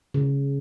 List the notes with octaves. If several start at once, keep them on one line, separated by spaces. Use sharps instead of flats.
C#3